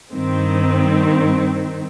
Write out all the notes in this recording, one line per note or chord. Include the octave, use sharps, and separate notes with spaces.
G2 D#3 C4